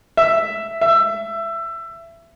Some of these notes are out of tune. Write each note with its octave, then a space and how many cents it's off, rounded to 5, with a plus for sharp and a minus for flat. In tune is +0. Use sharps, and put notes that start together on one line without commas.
E5 +5
E5 +20